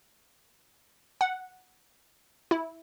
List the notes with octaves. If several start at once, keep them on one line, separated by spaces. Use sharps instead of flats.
F#5
E4